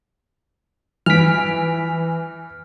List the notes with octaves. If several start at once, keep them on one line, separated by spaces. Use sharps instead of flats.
E3 F6 B6 D7